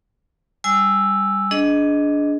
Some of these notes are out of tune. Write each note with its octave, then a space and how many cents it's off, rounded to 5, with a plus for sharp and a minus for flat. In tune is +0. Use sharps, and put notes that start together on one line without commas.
G3 +10 G#5 +0 E6 +0
D4 -15 G#4 +20 D#5 +0